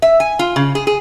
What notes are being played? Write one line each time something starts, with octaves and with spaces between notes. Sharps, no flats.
E5
G#5
F4
C#3
G#4
G#4